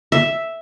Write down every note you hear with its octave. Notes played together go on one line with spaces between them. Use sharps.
E5